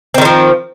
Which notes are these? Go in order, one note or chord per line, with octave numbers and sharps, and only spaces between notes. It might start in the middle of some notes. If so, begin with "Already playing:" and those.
D#3 F3 G3 C4